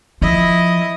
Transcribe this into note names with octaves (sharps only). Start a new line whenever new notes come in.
F3 E4 D#5